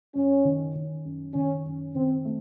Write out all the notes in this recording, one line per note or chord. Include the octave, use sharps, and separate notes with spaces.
F#2 C#4
D#3
D#3
F#2
D#3 C#4
F#2
D#3 C4
A3